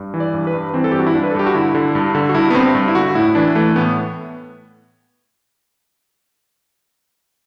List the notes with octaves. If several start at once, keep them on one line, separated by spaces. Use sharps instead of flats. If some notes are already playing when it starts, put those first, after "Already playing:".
Already playing: G2
E3
D5
G2
B4
G2
E3 C4
A4
G2 G4
F#4
E4
G2 D4
B4
A4
G2 G4
F#4
D3 E4
D3
G2
D3
F#4
G2 E4
B3
G2 C4
G2
E4
D3 F#4
A2 E4
E3 D4
E3 A3
A2 B3